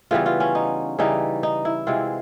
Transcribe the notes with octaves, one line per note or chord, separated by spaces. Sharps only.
C#3 E3 G3 B3 F4
F4
C#4
D#4
C#3 E3 G3 D#4
D#4
E4
C3 E3 G#3 C4 F4